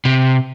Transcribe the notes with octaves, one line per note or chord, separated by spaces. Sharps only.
C3